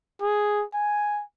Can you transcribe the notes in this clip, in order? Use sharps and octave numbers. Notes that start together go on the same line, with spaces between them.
G#4
G#5